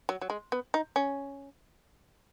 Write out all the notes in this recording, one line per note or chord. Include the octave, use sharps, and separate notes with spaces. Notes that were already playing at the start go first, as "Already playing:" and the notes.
F#3
F#3
G#3
B3
D#4
C#4